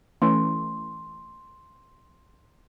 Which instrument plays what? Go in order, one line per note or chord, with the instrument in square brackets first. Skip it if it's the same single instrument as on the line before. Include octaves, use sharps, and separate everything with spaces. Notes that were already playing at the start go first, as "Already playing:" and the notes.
[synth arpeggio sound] E3 A3 C#4 [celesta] C6